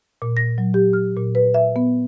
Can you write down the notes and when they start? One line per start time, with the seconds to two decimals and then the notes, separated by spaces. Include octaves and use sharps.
0.22 A#2
0.37 A#6
0.58 F#3
0.74 G4
0.93 F6
1.17 A#2
1.35 B4
1.54 E5
1.76 B3